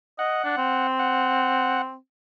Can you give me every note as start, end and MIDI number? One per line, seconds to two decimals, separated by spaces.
0.19 0.40 75
0.19 0.87 78
0.44 0.56 62
0.57 1.96 60
0.99 1.82 78